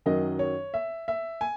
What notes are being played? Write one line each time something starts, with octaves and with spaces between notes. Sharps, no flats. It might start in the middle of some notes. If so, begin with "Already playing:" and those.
F#2 D#3 F#3 D#5
C#5
E5
E5
G#5